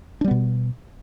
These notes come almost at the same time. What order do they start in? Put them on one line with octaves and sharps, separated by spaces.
D4 G3 B3 B2